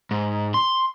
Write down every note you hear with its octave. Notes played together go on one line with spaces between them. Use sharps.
G#2
C6